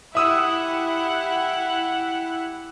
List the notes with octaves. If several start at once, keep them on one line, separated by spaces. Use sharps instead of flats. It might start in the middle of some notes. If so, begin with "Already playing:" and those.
E4 G4 E5 F#5 D#6 E6